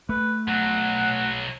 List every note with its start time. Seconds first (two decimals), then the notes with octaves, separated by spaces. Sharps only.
0.09 A3 B4
0.48 B1 F#3 F#5